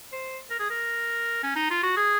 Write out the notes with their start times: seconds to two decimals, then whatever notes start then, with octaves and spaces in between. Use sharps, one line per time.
0.13 C5
0.50 A#4
0.60 G#4
0.70 A#4
1.43 C#4
1.56 D#4
1.70 F4
1.83 F#4
1.97 G#4